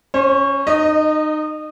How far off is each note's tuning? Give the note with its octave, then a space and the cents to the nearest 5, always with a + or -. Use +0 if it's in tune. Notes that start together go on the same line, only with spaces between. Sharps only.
C#4 +0 C5 +45
D#4 -25 D#5 +0